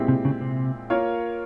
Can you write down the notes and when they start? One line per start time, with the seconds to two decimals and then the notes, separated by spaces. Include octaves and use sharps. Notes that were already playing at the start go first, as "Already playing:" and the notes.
Already playing: A#2 G#3 C4 E4 G4
0.08 C3
0.25 C#3
0.41 C3
0.90 A#3 F4 A#4 C#5